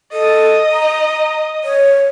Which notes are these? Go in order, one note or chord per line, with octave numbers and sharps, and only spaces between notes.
A4 D#5
A#5
C#5